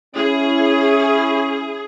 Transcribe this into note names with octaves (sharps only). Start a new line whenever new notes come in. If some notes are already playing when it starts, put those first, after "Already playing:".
C#4 E4 G#4